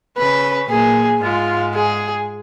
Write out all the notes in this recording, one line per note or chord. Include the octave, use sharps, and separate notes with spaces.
C#3 C#4 B4
A#2 A#3 G#4
G#2 G#3 F4
G#4